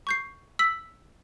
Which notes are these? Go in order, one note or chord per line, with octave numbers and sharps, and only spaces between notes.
C#6 G6 C7
E6 B6 F#7